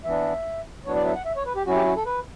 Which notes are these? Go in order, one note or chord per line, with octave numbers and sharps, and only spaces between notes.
E3 B3 D4 E5
A2 F#3 B3 D4 C#5
D5
E5
F#5
E5
C#5
B4
G4
F#3 C#4 E4 F#4
G4
F#4
A4
B4